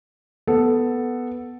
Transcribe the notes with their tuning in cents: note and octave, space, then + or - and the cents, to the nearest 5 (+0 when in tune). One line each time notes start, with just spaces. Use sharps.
B3 +0 A4 +0